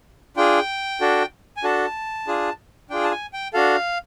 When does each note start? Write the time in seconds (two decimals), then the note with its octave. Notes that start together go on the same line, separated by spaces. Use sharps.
0.37 D4 F4 G#4 G5
1.01 D4 F#4 A4
1.57 G#5
1.64 D4 F#4 A4 A5
2.27 D4 F4 G#4
2.90 D4 F4 G#4 G5
3.04 A5
3.12 G#5
3.33 G5
3.53 D4 F#4 A4 F5